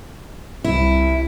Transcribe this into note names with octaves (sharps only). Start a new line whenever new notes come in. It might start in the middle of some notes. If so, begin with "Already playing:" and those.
C2 E4